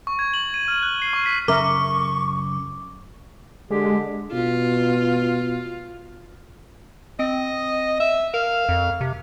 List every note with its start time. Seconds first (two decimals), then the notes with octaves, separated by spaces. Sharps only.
0.07 C#6
0.19 G#6
0.34 F#7
0.54 D#7
0.68 F6
0.83 F#6
1.02 C7
1.13 C#6
1.26 B6
1.48 F#2 C#3 A#4 E5 C#6 D6
3.71 D3 G#3 G4
4.33 B2 F4
7.19 C4 D#5
8.00 E5
8.34 A#4 F5
8.69 F2
9.01 C3